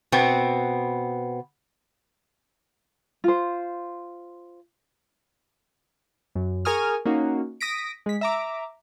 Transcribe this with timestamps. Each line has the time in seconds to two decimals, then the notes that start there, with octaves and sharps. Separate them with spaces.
0.12 B2 B3 C4
3.24 F4 C5
6.35 F#2
6.65 G#4 A#4 G#5 C#6 D#6 F6
7.06 A#3 C#4 D#4 F#4
7.61 D#6 A#6 B6 D7
8.06 G#3 B6
8.21 E5 A#5 D6